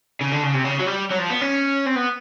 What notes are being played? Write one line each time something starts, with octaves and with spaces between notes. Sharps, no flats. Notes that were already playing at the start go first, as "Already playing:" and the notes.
C#3
D3
C#3
C3
C#3
F#3
G3
F#3
F3
B3
C#4
C4
B3